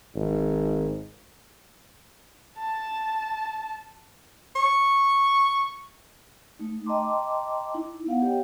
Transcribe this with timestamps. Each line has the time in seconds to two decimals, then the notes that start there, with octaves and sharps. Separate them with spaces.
0.16 G#1
2.59 A5
4.56 C#6
6.59 A3 D#4
6.86 D#5 G5 A5 A#5 C6 D6
7.74 D#4 E4
8.06 B3 F5 F#5
8.22 G4 C#5 D#5 G5